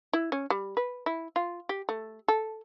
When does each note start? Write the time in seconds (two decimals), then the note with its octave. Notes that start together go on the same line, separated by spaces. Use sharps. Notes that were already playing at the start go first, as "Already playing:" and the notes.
0.13 E4
0.32 C#4
0.50 G3
0.77 B4
1.06 E4
1.36 F4
1.69 G4
1.89 A3
2.28 A4